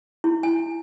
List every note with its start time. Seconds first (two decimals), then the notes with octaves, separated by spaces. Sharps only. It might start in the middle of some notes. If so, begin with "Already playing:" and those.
0.24 E4
0.43 G#5